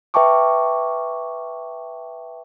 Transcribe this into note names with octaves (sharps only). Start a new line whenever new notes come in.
B4 E5 G5 A5 C#6 D6